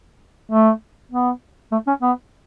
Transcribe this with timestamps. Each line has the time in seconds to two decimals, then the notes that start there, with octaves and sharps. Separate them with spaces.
0.52 A3
1.12 B3
1.72 A3
1.87 C#4
2.02 B3